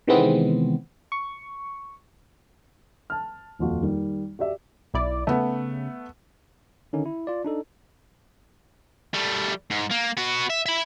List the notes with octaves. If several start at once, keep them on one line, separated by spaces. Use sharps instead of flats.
C3 D#3 E3 G#3 B3 C4
C#6
A5 F6
D#1 F2 F4 F#4
D#3 G3
F#4 G4 D5 E5
B1 E4 D5
C#3 A3 B3
D3 D#3 C#4 D#4
E4
F4 D5
D4 D#4 A4
G3 A3
G#2
A#3
B3 F#4
E5
E5 B5